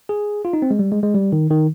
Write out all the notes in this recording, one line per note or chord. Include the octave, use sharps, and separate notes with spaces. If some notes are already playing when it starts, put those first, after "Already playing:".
G#4
F4
D#4
C4
G#3
G3
G#3
G#3
G3
D#3
D#3